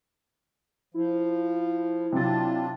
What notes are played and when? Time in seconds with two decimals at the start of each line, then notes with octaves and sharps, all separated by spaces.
0.94 F3 E4
2.12 C3 F#3 D4 F4 A6